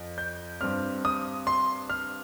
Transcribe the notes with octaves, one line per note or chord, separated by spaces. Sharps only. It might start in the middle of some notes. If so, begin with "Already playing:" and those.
Already playing: F2
G6
G2 G3 C4 F6
D#6
C6
F6